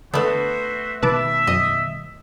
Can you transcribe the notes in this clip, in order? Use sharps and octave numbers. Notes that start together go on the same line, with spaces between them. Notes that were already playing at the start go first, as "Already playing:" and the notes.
D3 A3 B3 F#4 C5 E5
B2 D#3 G3 B4 E5 A5 D6
F#2 D#5